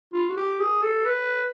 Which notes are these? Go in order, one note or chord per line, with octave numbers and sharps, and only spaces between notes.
F4
F#4
G4
G#4
A4
B4